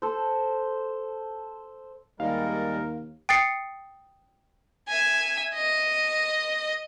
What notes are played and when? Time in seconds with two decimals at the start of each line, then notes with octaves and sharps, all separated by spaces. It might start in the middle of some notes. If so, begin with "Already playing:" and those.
0.02 A4 C5
2.20 D#2 G3 G#3 A#4 F5
3.29 G5 D#6 A6 C7 C#7
4.88 E5 G#5
5.55 D#5